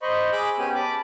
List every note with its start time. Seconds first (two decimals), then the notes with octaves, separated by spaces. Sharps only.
0.02 C5 D#5 B5 C#6
0.33 G#4 B5 D6 E6 F#6
0.59 B3 C#4 G4 G#5
0.75 A5 B5 D6